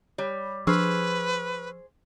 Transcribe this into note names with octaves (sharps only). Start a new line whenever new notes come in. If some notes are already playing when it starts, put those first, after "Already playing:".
G3 C#5
F3 D4 G#4 B4 C5 C#6 E6 F6